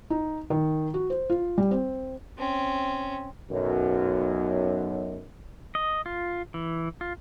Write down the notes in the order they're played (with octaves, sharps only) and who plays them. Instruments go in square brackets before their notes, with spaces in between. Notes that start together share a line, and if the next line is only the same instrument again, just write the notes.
[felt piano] D#4
D#3
F#4
C5
F4
G3
C4
[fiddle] C4 C#4
[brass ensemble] B1 F#2
[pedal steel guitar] D#5
F4
E3
F4